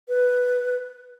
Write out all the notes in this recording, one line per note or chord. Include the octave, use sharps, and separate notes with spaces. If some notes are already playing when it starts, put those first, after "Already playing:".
B4